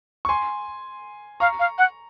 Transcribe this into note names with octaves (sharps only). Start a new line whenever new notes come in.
C#6
G#5 C6
F5 A#5 C#6
F5
F#5